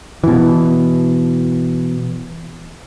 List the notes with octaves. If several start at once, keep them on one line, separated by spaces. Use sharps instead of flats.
B2 E3